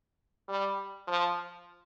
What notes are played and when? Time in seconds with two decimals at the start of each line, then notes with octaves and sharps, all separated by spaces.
0.49 G3
1.07 F3